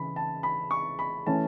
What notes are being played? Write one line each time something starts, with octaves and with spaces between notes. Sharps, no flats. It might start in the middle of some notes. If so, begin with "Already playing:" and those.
Already playing: C#3 E3 B5
A5
B5
C#6
B5
E3 A3 C#4 A5